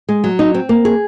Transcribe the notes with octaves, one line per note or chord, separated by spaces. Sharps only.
G#3
F#3
D#4
C4
A#3
G#4